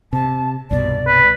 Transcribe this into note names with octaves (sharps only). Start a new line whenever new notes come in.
C3 A5
C2 G2 B2 D5
B4